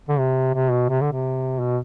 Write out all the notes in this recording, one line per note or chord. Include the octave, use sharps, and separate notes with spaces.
D3
C3
C3
B2
C3
D3
C3
B2